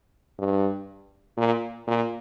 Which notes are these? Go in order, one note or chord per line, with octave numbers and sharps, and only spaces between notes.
G2
A#2
A#2